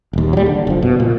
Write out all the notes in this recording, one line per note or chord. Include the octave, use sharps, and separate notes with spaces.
D#1 D#2
F#3 G3
D3
F#1 F3
B2
A#2